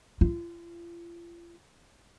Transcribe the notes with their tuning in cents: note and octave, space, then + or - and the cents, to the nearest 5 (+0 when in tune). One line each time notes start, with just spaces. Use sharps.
F4 -40